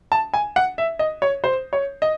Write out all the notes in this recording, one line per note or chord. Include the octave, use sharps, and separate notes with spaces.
A5
G#5
F#5
E5
D#5
C#5
C5
C#5
D#5